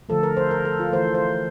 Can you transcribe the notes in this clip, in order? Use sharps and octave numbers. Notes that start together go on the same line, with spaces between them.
D3 F3 A3 A4
A#4
C5
A#4
A4
F4
E3 A3 C5
C5